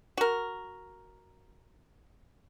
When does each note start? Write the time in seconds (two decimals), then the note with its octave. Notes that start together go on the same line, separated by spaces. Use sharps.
0.17 F#4 A#4